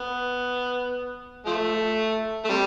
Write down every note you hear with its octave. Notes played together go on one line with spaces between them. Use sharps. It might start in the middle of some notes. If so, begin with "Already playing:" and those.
Already playing: B3
F3 A3
A3
C3 G3